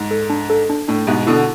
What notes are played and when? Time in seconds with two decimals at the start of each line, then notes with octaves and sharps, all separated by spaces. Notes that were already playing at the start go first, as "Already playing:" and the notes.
Already playing: G#2
0.11 A4
0.30 D4
0.50 A4
0.70 D4
0.88 A2 D4
1.07 G#2 B2 E5
1.27 B2 D3 E4